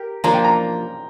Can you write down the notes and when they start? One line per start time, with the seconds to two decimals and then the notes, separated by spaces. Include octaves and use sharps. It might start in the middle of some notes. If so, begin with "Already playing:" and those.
Already playing: G4 A#4
0.24 F3 A#3 D4 F4 A#5
0.34 G5
0.44 A#5